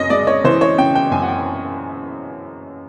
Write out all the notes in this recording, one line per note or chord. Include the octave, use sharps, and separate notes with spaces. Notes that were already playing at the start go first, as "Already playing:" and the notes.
Already playing: F#2 C#3 C#5 D#5
G#3 D5
C#5
E3 C5
C#5
C#3 G5
G5
F#2 G#5
F#5
G5